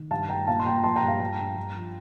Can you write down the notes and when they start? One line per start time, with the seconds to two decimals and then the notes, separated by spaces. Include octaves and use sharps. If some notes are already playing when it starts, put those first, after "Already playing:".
Already playing: D#3
0.10 G2 F5 A5
0.29 G2 G5 A#5
0.47 A#2 F5 A5
0.60 C6
0.65 A#2 G5 A#5
0.84 F3 A5 C6
0.96 G5 A#5
1.03 G2
1.08 F5 A5
1.20 G2 G5 A#5
1.38 G2
1.57 G2
1.75 F3